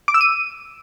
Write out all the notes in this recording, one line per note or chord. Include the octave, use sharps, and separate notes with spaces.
D6
E6
D#7